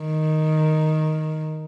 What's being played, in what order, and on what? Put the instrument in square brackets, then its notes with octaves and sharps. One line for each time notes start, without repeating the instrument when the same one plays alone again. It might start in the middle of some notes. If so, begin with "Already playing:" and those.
Already playing: [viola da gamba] D#3